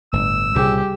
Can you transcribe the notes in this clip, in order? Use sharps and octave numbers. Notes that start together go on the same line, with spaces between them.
G1 A2 E6
C2 A#2 C#3 G3 G4 G#4